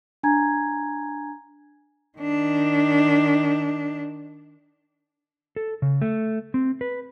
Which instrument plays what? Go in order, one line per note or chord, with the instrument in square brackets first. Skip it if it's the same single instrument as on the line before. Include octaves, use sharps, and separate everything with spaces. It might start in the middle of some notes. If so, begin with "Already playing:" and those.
[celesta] D4 G#5 A#5 G#6
[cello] D#3 D4
[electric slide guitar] A4
C#3
A3
C4
B4